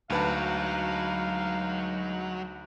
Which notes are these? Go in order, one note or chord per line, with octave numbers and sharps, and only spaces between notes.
D2 F#3 G#3 D#4 B4 F5 A5